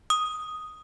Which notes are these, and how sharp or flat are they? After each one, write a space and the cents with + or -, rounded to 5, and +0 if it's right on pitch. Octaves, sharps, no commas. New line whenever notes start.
D#6 +0